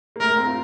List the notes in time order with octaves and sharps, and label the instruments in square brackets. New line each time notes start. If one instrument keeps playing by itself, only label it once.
[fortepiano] A#3
[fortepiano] A3 [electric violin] A#4
[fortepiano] A#3
C4
F4